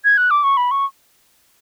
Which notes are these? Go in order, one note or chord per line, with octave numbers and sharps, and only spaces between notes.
G#6
F#6
D6
C#6
B5
C#6